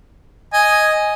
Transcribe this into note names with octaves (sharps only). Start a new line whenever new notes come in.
D#5 G#5